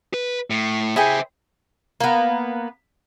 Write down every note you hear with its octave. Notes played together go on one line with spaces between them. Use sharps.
B4
A2
E4 G#4 C5 E5 G5
A#3 B3